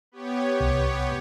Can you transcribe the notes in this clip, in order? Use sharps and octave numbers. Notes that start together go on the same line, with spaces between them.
B3 G4 C#5
C2